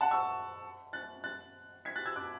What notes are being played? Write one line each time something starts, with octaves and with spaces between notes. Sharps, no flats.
F#5 A5
C#6 E6
F#6 A6
F#6 A6
G#6 B6
F#6 A6
E6 G#6
D6 F#6